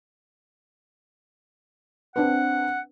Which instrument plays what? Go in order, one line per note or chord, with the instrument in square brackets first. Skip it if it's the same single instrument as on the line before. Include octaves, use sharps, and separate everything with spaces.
[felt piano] C4 D4 B4 [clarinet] F#5